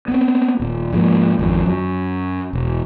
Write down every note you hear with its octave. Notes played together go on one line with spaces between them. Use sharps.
B3 C4
D#1
G#2 F3 A#3
G#1 F2 F3
F#2
E1